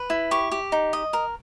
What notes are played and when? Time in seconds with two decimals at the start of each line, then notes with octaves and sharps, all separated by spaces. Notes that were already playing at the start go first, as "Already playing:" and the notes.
Already playing: B4
0.10 E4
0.31 G4 C#6
0.52 G4
0.72 D#4
0.93 D#5
1.13 A#4